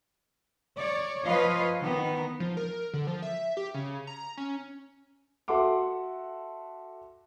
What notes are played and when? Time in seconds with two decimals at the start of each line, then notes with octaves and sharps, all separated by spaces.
0.79 C#5 D5
1.25 F3 F4 B4 C#5 D#5 F5
1.81 D#3 B3 D#4
2.40 F3
2.57 A#4
2.93 D3
3.07 F3
3.22 E5
3.57 G4
3.74 C#3
4.07 A#5
4.37 C#4
5.48 F#4 A4 E5 F#5 C6 D6